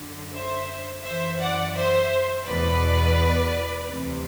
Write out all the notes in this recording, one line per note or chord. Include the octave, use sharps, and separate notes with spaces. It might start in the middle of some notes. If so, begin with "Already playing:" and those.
Already playing: F#2 D3
C5 E5
F#2 E3 C5 E5
D5 F#5
C5 E5
E2 B2 B4 D5
D2 C3 E3